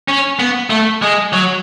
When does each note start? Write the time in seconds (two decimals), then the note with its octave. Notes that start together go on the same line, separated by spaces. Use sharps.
0.08 C#4
0.40 B3
0.70 A3
1.02 G#3
1.33 F#3